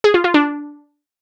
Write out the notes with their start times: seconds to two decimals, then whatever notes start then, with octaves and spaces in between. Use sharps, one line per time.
0.04 G#4
0.14 F4
0.24 F4
0.34 D4